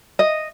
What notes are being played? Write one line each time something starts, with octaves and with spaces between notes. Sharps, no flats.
D#5